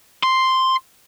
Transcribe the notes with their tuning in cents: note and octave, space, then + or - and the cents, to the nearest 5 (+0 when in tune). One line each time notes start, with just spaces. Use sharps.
C6 +0